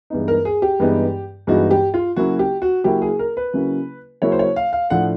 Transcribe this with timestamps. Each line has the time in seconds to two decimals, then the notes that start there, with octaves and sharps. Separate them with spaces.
0.10 G2 E3 G#3 B3 D#4
0.28 A#4
0.45 G#4
0.62 G4
0.80 G2 E3 G#3 B3 D#4
1.47 G2 E3 G#3 B3 D#4 F#4
1.71 G4
1.94 F4
2.16 C#3 F#3 A#3 C#4 E4 F#4
2.39 G4
2.62 F#4
2.84 C#3 F#3 A#3 C#4 E4 G4
3.02 G#4
3.19 A#4
3.37 B4
3.53 C#3 F#3 A#3 C#4 E4
4.22 C#3 F#3 A#3 C#4 E4 C#5
4.32 C5
4.39 C#5
4.56 F5
4.73 F5
4.90 A2 F3 A3 D4 F#5